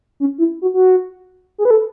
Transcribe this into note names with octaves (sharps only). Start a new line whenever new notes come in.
C#4
E4
F#4
F#4
G#4
B4
A4